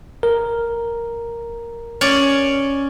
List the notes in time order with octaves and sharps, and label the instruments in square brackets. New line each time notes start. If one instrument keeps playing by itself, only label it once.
[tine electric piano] A#4
[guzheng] C#4 D5